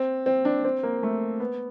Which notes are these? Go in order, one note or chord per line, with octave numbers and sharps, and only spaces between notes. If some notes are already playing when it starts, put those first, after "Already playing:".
Already playing: C4
C4
D4
C4
A#3
A3
B3